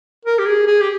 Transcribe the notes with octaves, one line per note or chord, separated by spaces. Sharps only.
A#4
G4
G#4
G#4
G4